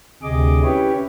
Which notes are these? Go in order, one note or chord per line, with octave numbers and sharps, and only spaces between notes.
D2 C3 G#4 D#5 D6
C#4 E4 G4 B4 C#5